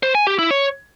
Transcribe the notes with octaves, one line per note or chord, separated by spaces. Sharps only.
C5
G#5
G4
E4
C#5